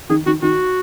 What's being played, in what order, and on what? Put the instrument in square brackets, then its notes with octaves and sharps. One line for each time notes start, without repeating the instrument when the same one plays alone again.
[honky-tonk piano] D#3 [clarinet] G#4
[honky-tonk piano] D#3 [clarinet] F#4
[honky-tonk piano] D#3 [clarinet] F#4